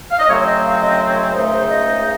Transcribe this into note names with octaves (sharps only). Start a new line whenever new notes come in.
F5
D#5
F#2 C#3 F#3 A3 C4 C#5
C#5
D#5
F5
D#5
C#5
C#2 C#3 A3 D#4 C5
C5
D#5